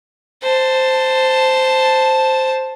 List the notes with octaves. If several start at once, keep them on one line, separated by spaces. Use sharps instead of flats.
C5 A5